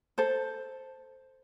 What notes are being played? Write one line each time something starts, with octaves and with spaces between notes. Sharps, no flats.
A4 C5